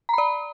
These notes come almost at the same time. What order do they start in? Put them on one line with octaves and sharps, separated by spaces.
A#5 B5 D5